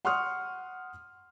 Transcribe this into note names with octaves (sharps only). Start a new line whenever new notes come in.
F#5 C6 C#6 D#6 F6